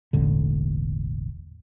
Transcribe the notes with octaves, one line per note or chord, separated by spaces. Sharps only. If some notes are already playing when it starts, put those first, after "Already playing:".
E1 A1 A2 D3